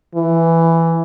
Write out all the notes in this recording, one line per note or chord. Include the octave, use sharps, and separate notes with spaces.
E3